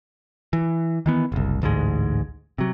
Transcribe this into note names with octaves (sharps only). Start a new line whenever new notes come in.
E3
D#3 E3 B3
F#1 C2
A1 D2 G#2 G#3
C3 F#3